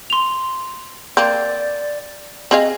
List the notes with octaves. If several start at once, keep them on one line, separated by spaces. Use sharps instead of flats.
C6 F7
A#3 C4 D5 G6
C4 G#4 D#5 F5